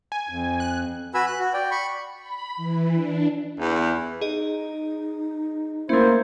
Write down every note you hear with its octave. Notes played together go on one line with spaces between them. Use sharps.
G#5
F2
F#6
F#4 B4 G#5 B5 E6
F#6
F#4
D5 G5
B5 C#6
B5
E3
D4
E2
D#4 G#4 D#5
A3 A#3 C#4 E4 C5